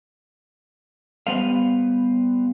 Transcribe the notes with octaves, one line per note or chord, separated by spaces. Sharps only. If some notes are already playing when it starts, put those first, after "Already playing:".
G3 B3 B4 C5 F5